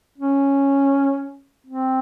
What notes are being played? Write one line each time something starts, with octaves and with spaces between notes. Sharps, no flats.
C#4
C4